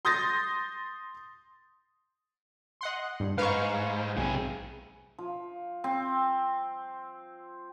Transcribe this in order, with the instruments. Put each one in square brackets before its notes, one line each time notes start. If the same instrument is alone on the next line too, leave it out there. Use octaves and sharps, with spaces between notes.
[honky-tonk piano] C6 D#6 G6 A6 A#6
[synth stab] D#5 F#5 C6
G2
[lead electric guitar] G#2 [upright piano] B4 [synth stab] F5 C#6
[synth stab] B1 [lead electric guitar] C3 G#4
[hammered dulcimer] F3
C4